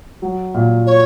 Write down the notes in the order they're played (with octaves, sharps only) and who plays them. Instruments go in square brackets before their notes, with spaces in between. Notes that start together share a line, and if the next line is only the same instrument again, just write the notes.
[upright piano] F#3
A#2
[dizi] C#5